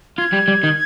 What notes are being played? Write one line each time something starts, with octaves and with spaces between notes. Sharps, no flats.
F4 G#6
G3
G3
D#3